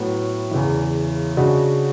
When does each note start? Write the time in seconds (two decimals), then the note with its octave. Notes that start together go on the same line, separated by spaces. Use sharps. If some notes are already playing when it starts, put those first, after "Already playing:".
Already playing: A2 F#3 B3
0.51 E2 C#3 E3
1.37 C#3 G#3 D4 F#4